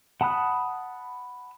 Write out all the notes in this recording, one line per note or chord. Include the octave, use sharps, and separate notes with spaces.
F#5 A5 B5 D#6 F#6